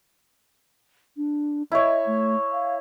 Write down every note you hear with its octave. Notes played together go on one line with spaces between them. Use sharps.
D4
E4 C#5 D#5
A3
F5